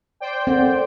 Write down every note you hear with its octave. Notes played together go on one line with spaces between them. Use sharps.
C5 D5 G5
C4 A4 A#4 F#5